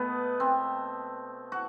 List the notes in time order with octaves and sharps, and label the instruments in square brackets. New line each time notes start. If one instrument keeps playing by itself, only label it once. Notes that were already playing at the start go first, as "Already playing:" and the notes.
Already playing: [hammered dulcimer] B2 A3 B3
C4
F#4